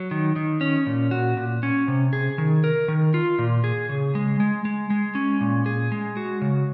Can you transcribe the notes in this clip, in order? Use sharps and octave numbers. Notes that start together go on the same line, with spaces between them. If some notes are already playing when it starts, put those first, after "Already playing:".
Already playing: F#3
D#3
D#3
C#4
A#2
F#4
A#2
C#4
C3
G#4
D#3
A#4
D#3
F4
A#2
G#4
C#3
G#3
G#3
G#3
G#3
C#4
A#2
G#4
G#3
F#4
C#3